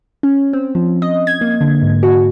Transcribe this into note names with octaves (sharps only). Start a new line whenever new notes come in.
C#4
C4
F3
D#5
G#6
A#3
D3
G#2
F#4